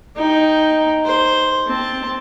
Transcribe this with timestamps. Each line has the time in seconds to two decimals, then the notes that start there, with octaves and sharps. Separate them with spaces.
0.16 D#4 G5
1.05 C5
1.67 C4 A5